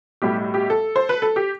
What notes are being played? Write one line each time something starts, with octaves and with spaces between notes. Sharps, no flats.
B1 A2 G3 G4
G4
A4
C5
B4
A4
G4